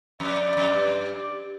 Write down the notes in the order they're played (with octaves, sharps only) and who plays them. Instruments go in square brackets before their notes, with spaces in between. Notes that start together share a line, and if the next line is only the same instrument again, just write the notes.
[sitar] F2 [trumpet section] D5
[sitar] F2
G2
[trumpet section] D5